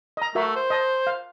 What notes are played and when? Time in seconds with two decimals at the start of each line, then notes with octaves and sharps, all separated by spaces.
0.17 D#5 A#5
0.35 A3 F#4 A#4 E5
0.56 C5
0.70 D#5 A5
1.07 F5